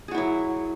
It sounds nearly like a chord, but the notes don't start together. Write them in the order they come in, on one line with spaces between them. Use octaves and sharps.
G#4 F#4 E4 F#3